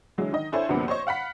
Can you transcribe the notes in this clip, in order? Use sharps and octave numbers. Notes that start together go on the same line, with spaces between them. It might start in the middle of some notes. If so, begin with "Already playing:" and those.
D3 E3 F#3 G#3
D#3 D#5
D4 E4 A4 C5 C#5 G#5
D2 G2 C3 F3 A#3 B3
C5 C#5 D#5 C#6
F5 F#5 B5 B6